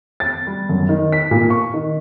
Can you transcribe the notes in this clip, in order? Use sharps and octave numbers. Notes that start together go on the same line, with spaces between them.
A6
G3
F#2
D#3
B6
A#2
C#6
D#3